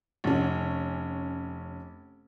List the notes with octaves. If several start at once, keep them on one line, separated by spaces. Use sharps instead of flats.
F1 C#4